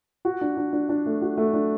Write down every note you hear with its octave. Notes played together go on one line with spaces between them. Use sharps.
F#4
D4
D4
D4
D4
A3
F#4
A3
D4